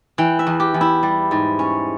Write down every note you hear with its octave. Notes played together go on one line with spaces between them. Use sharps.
E3 G5
E5
E2
G4
E2
E4
G3
G#2
C#4